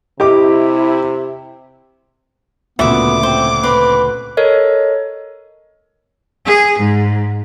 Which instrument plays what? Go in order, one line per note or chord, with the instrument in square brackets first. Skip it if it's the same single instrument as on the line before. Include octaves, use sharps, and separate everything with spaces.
[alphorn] C3 [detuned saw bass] E4 [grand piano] G4 D#5 D6
[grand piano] D2 A#2 C#3 [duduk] B3 [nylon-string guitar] F#4 E5 [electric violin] D6
[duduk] C4 [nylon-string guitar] C5
[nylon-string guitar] C4 [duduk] B4
[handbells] A4 A#4 C#5 D#5
[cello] G#4
G#2